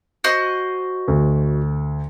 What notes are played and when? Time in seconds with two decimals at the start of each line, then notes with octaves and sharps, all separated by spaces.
0.24 F#4 C5 D#5
1.08 D2